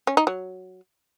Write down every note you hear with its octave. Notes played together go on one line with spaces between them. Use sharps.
C#4
D#4
F#3